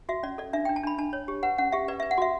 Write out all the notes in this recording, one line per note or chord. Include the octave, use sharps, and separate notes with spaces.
F#4 E5
C#4 D5
A4 D5
D4 E5
D4 G5
A5
D4 B5
D4 A5
C#5
G4
B4 F#5
C#4 F#5
G4 E5
B4 D5
B4 E5
F#5
F#4 E5